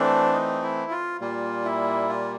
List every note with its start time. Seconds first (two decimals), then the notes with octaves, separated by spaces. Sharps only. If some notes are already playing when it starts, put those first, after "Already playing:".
Already playing: E3 A3 C4 D4
0.33 D#4
0.62 E4
0.91 F4
1.20 A#2 G3 A#3 F4
1.65 E4
2.09 F4